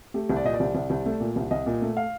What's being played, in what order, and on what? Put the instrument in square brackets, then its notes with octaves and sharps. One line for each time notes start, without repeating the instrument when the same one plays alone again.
[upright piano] A3 G4
C2
D5
A#2 D#5
D5
C2
C2
C2
A3
A#2
C2
C2 D#5
A#2
A3
F5